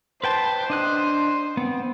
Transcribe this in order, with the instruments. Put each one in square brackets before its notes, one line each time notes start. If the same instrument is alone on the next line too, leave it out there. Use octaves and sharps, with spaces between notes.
[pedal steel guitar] B4 G5 A5 [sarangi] C5
[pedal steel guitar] D4 D#5 F#6
B3 C4